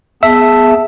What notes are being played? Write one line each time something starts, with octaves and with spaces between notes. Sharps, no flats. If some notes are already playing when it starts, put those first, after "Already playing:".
B3 G#4 E5 A5